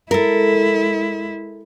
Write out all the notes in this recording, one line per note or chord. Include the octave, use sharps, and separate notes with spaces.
G#3 E4 A4 A#4